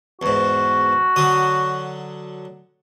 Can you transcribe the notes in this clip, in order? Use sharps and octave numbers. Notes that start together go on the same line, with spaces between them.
E2 G#2 F#4
D3 F#3 D#6